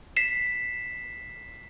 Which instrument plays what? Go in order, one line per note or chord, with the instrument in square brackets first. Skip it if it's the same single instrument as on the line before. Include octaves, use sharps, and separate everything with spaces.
[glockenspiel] B6 C7 E7